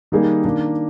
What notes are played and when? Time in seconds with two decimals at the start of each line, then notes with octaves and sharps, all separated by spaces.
0.12 D#3 G3 A#3 D#4 G#4
0.44 D#3 A#3 D4